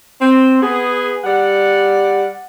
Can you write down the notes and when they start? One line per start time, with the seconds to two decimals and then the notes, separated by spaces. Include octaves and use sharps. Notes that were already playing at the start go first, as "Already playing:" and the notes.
0.21 C4
0.62 B3 G#4
1.24 G3 D5 F#5